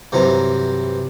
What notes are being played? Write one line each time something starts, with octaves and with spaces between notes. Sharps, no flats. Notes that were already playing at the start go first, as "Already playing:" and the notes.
G2 C3 E3 F#3 C5 A#5